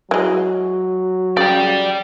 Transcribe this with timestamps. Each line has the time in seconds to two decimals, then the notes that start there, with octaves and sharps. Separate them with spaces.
0.11 E3 F#3 G#3
1.37 C#3 D5 G5